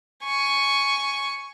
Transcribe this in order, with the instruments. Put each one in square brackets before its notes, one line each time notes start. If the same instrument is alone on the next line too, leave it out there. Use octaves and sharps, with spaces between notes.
[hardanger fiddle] G#5 C#6